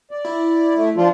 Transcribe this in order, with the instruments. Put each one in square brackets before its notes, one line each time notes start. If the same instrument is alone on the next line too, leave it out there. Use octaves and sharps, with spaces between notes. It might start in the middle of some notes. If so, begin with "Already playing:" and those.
[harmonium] D5
[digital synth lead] E4
[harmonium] A3
F3 D4 F4